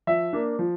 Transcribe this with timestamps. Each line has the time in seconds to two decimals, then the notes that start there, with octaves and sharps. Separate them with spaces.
0.07 F3 E5
0.33 A#3 D4
0.59 F3